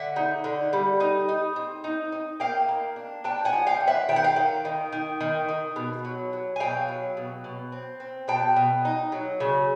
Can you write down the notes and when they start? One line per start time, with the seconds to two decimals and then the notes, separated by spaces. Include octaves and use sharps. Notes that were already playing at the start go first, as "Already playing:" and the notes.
Already playing: D3 E5 F#5
0.16 D#4
0.44 D3
0.73 G3
1.00 D#4
1.29 D#4
1.56 C4
1.84 D#4
2.12 D#4
2.40 A#3 F5 G5
2.68 A#3
2.96 D4
3.24 D4 G5 A5
3.45 F#5 G#5
3.53 F3
3.67 F5 G5
3.80 D4
3.87 E5 F#5
4.09 D#3 G5
4.16 F#5
4.24 F5 G5
4.36 D#3
4.65 D#3
4.92 D#3
5.21 D#3
5.48 D#3
5.76 B2
6.05 F#3
6.33 F#3
6.56 G#5
6.60 B2 F5 G5
6.88 F#3
7.17 B2
7.44 B2
7.72 C4
8.00 C4
8.28 B2 G5 A5
8.56 B2
8.85 D#4
9.12 F#3
9.40 C#3